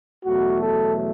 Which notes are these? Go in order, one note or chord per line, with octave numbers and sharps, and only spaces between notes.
E2 B2 F#3 A3 F#4
A4